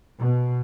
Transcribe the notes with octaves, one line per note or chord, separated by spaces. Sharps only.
B2